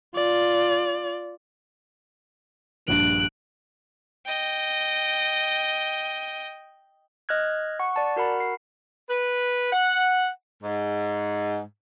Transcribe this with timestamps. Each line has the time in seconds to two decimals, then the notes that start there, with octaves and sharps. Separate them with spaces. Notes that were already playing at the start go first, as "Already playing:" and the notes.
0.15 F4 D5
2.88 A#1 G2 F#6 D7
4.26 D#5 G5
7.29 D#5 F6 F#6 G#6
7.80 F#5 C#6
7.96 D5 A5
8.16 F#4 A#4 F#5 B5
8.40 C7
9.10 B4
9.72 F#5
10.62 G#2